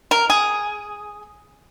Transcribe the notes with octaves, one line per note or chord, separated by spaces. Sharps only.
A#4
G#4